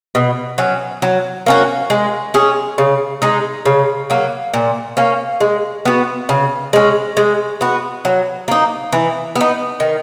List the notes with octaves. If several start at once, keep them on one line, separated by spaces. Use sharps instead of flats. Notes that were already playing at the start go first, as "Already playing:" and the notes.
B2
F#3 C#4
F#3
A#3 C#4 F#4
G#3
C#4 G#4
C#3
G#3 D#4
C#3
F#3 A#3
A#2
A#3 C#4
G#3
B3 F#4
C#3
G#3 C#4
G#3
B3 F#4
F#3
A#3 D#4
E3
B3
D#4
D#3